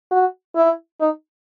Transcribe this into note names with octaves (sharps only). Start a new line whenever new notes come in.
F#4
E4
D#4